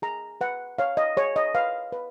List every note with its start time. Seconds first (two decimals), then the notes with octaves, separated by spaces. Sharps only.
0.02 G#4 A#5
0.41 B4 F#5
0.78 C#5 F5
0.97 D#5
1.17 G#4 C#5
1.36 D#5
1.55 B4 F5
1.92 B4